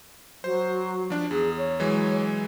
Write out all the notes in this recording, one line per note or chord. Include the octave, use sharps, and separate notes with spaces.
F#3 C5
F3 D4
E2 G#4
C#5
E3 F#3 G#3